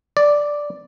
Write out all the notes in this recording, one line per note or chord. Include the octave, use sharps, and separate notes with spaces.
D5